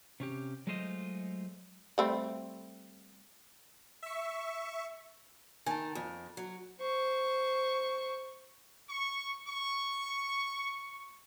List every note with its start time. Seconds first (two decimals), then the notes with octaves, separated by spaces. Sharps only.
0.20 C3 C#4 G4
0.67 F#3 G#3 A3 F4 C5 D#5
1.98 G3 A3 C4
4.03 E5 C#6
5.66 D#3 G#5 A5
5.95 F2
6.37 F#3
6.80 C5 C#6
8.90 C#6
9.48 C#6